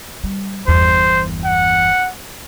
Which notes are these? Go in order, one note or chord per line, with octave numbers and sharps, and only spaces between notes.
G3
G1 E2 C5
F#5